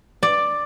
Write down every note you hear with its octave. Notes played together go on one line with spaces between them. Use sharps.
D5